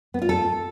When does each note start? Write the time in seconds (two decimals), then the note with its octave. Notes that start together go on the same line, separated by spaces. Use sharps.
0.14 B3
0.22 F4
0.29 A4